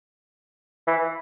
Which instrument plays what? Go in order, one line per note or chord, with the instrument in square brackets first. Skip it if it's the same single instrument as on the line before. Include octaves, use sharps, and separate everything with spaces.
[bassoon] E3